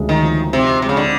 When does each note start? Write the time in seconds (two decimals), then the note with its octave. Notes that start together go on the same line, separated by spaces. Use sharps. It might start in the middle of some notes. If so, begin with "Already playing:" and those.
Already playing: D2 C#3 F3 G#3
0.09 D#3
0.23 F3
0.53 C3 C4
0.82 C3 G#3
0.89 C#3
0.97 D3